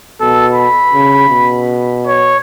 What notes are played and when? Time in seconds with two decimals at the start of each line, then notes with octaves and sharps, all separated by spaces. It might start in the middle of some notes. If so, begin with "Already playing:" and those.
0.21 B2 A4
0.55 B5
0.93 C#3
1.29 B2
2.07 C#5